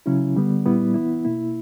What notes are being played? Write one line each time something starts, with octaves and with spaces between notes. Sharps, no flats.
C#3 F#3 C#4 E4
D3 G3 B3
A#2 G3 B3 E4
E3 B3 E4
B2 A#3 E4